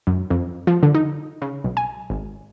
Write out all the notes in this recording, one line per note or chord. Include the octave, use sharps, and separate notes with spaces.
F#2
F2
F3
D3
D#4
C#3
B1
G#5
G#1